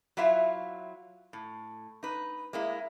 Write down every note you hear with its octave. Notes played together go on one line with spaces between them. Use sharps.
F#3 E4 F4 E5
A2
D#4 B4
G#3 A#3 E4